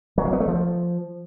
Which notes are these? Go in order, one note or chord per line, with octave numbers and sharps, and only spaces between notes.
F#3
A#3
B3
A3
F3